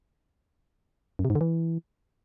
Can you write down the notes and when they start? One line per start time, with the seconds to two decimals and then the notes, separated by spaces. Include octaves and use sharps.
1.19 F#2
1.25 C3
1.30 G#2
1.35 D3
1.41 E3